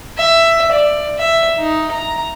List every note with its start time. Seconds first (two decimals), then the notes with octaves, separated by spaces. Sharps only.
0.18 E5
0.72 D5
1.19 E5
1.58 D#4
1.91 A#5